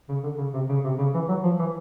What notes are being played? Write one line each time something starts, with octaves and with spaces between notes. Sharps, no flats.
C#3
D3
C#3
C3
C#3
C3
C#3
E3
F#3
F3
E3